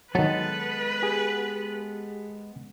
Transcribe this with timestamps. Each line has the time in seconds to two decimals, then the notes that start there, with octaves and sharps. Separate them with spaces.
0.15 D#3 F#3 G#3 B3 A4 B4
1.02 G4 G#4